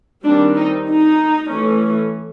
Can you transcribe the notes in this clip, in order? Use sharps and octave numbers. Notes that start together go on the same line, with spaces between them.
D#3 G3 C4 D4
D#4
D#4
E3 A3 C#4